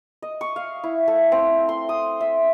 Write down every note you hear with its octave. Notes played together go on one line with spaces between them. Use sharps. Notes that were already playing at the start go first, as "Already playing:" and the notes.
D#5
C#6
F5
E4
A3
C4
C6
D#6
E5